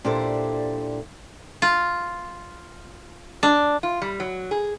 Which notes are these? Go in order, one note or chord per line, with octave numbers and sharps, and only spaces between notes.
A#2 D4 E4 G4 A4 C5
F4
D4
F4
G3
F#3
G#4